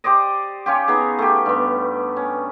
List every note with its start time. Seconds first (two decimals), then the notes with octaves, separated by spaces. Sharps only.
0.04 G4 C5 D5 D#5
0.66 C#4 F4 G4
0.88 B3 D#4 G#4
1.19 A3 G4
1.46 G2 B3
2.17 C#4